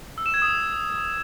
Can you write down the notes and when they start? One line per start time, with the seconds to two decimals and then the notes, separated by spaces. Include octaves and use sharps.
0.18 E6
0.26 E7
0.34 G#6
0.42 D#6